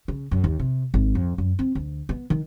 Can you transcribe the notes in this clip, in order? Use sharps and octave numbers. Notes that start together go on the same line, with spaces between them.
C#3
F#2
D#2
C3
G#1
F2
F#2
C4
D2
B3
D#3